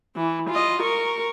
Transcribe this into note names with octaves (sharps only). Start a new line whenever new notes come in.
E3
F4 D#5
A#4 C#6